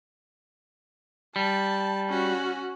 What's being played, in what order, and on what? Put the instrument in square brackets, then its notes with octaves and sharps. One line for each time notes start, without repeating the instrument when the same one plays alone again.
[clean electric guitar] G3 [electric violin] A5
[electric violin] C#4 F#4